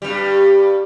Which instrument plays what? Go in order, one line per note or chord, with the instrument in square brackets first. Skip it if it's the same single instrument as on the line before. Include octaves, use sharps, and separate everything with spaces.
[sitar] G2 G3